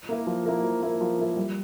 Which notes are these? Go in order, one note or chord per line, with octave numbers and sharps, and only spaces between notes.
A#3 E4 A#4
F3
A#3 E4 A#4
F3
A#3 E4 A#4
F3
A#3 E4 A#4
G3